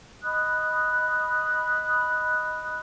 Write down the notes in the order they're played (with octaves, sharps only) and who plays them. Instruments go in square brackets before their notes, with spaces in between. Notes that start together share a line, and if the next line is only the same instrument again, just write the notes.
[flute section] D#5 B5 D#6 F#6